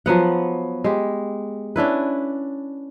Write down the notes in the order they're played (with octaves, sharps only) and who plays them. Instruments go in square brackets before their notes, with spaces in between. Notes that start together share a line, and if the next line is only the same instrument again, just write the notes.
[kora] F3 F#3 B3 F#5
G#3 G4
C#4 D4 E4 B4